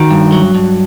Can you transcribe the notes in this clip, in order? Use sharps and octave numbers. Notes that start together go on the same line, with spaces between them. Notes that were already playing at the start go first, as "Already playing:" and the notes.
Already playing: D#3 F#4
G2
F#3
G2